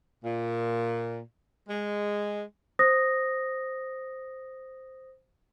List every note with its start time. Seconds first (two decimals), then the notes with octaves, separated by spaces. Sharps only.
0.25 A#2
1.69 G#3
2.79 C5 D#6 A#6